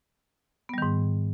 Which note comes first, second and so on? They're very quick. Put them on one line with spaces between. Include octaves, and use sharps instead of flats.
B3 G3 D#3 G#2